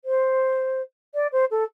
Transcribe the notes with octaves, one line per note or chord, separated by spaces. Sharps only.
C5
D5
C5
A4